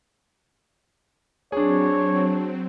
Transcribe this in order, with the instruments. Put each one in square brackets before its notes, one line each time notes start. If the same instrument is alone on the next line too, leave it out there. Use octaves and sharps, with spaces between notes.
[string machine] F#3 C4 [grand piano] D4 G#4 [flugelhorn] C#5